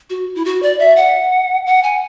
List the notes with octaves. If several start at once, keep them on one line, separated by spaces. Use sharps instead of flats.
F#4
E4
F#4
D5
E5
F#5
F#5
G#5